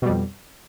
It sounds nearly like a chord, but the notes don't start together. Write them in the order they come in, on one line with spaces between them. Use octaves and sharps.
B2 G3 F2